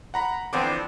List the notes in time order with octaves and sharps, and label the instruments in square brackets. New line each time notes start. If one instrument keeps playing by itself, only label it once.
[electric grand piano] F#5 A#5 B5
[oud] D3 E3 F3 [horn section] B3 C4 D4 [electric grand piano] D6